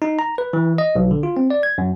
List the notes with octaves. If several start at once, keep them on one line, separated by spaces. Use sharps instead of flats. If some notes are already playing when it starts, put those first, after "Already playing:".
D#4
A#5
B4
E3
D#5
B1
D3
F4
C4
D5
G#6
F#2